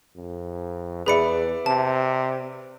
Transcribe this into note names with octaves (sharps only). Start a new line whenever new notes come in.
F2
E2 G#4 B4 D5 E5 B5 C#7
C3 A5